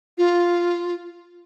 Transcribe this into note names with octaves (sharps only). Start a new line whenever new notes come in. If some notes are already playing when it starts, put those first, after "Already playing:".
F4